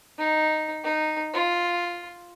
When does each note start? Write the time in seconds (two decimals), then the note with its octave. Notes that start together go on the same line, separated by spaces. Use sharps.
0.18 D#4
0.84 D#4
1.34 F4